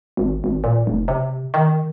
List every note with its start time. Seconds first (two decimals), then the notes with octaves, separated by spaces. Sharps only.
0.17 G#1
0.44 G#1
0.64 A#2
0.87 F1
1.08 C3
1.54 D#3